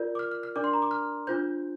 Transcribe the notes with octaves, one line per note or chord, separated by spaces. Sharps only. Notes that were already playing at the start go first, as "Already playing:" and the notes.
Already playing: F4 A#4 D5 G6
D6
F6
F6
F6
D4 A#4 D5 D6
C6
A#5
D6
F6
D4 F4 C5 G6